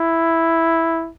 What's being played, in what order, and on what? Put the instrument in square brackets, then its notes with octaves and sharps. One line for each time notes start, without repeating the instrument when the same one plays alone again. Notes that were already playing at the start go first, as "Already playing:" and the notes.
Already playing: [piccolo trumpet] E4